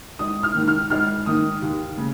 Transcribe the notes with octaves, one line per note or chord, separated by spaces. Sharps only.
G#1 D#6
F6
G#2 D#3
F6
G#1 F6
G#2 D#3 D#6
D#2
C#3